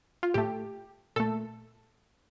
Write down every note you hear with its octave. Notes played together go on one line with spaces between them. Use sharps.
F4
A2 A3 G4
A#2 A3 A4